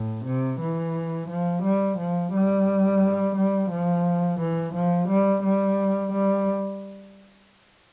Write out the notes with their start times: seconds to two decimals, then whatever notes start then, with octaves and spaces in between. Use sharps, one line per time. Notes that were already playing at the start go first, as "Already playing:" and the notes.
Already playing: A2
0.25 C3
0.60 E3
1.29 F3
1.63 G3
1.98 F3
2.32 G3
3.36 G3
3.70 F3
4.40 E3
4.74 F3
5.09 G3
5.43 G3
6.13 G3